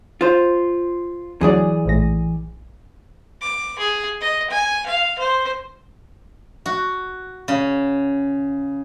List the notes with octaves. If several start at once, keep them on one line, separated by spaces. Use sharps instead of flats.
F4 C5
D2 E3 F#3 G#4 D5
A#1 A2 A#6
D6
G#4
D#5
G#5
F5
C5
F#4
C#3